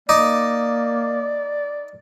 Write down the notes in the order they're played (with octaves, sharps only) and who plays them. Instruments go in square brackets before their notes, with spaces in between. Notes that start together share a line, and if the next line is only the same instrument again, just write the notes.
[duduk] A#3 [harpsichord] D#4 [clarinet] D5 [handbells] D6